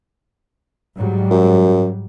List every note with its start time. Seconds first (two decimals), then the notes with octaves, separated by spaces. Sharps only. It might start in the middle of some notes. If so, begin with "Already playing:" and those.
0.96 G#2 F#3 G3
1.31 F#2